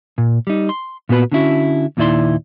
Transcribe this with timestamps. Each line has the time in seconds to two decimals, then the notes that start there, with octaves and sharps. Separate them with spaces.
0.18 A#2
0.47 G3 D#4
0.69 C6
1.09 A#2 B3 F#4 B4 B5
1.32 D3 C#4 E4 F#4
1.97 D#2 A#2 D#3 E4 D5 C6